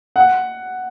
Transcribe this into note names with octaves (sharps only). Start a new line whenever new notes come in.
F#5